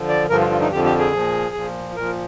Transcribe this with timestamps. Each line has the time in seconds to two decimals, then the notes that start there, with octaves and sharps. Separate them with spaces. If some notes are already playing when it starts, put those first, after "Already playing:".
Already playing: D3 F3
0.09 D5
0.29 G2 D3 F3 A#4
0.40 F4
0.50 F4
0.60 D#4
0.71 F2 D3 F3 G4
0.85 G4
0.99 G#4
1.12 A#2 F3
1.55 A#2 F3
1.96 A#2 F3 A#4